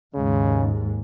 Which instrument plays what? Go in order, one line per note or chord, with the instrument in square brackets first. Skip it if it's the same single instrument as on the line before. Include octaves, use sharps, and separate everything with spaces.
[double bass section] D#2 G#2 G#3 [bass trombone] C#3